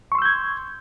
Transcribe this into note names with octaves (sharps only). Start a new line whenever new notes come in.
C6 C#6 E6 G6 G#6